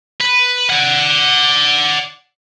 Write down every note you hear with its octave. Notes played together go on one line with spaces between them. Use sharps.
B4
D5 F#5